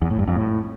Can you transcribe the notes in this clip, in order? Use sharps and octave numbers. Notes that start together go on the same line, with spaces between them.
E2
A2
G2
F2
A2